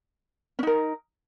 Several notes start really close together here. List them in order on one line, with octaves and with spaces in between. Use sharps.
C#4 D#4 A#4